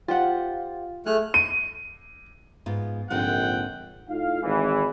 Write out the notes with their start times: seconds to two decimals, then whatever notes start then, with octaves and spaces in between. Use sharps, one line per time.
0.08 F4 G4 C5 F5 F#5
1.06 A3 G#4 F6 F#6
1.34 D#7
2.66 G#2 B3 F4
3.10 A#1 G#2 D3 C4 F#5 G5
4.09 A2 D#4 F4 F5
4.43 G#1 E3